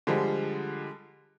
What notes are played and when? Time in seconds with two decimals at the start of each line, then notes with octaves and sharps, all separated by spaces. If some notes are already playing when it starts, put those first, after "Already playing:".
0.07 D3 F3 G3 G#3